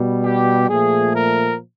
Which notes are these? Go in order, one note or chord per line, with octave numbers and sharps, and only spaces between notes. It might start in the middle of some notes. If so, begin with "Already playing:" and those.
Already playing: B2 G3
G4
A#2 F3 A3 G#4
A#4